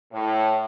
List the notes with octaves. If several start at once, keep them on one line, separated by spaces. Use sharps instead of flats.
A2